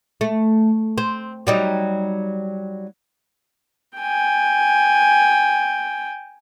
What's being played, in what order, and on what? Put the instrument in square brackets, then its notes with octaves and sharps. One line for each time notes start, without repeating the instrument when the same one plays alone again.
[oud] A3
C4
F#3 G3 D#4
[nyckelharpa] G5 G#5